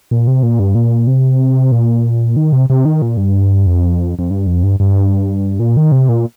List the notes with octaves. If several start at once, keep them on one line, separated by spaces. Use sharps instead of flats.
A#2
C3
A#2
G2
A#2
C3
A#2
D#3
C3
C3
D#3
A#2
G2
F2
F2
G2
F2
G2
G2
A#2
D#3
C3
A#2